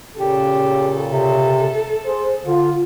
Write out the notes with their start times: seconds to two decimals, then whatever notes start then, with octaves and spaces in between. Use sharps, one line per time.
0.18 A#2 C#3 G4 A4
1.10 C3
2.04 G#4 C5
2.45 D3 F4